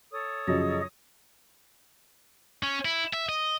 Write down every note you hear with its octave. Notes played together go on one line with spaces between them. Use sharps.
A4 C#5 D#6
F#2 C#3 F3 G#4 D#5
C#4
E4
E5
D#5